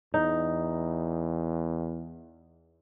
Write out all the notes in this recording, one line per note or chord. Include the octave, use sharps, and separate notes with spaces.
E2 D#4